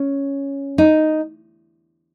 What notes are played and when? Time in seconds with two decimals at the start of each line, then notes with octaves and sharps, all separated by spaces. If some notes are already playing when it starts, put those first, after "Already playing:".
Already playing: C#4
0.78 D#4